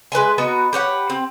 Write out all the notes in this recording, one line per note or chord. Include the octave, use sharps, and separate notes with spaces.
G#3 B4 E5 G#5
B3 D#4 F#4
G4 B4 C#5 F#5
C4